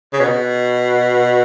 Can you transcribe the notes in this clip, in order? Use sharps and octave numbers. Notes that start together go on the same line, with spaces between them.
C#3
B2